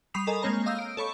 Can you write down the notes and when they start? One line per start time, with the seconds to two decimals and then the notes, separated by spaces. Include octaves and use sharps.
0.14 G3 B5 C#6 D#6 C7 F7
0.27 A4 A#4 D#5 G#5 A#5
0.43 G#3 A#3 C4 C#5 A#5
0.66 D#5 F5 D#6 E6 G6
0.79 D7
0.97 A4 C#5 B5 C#6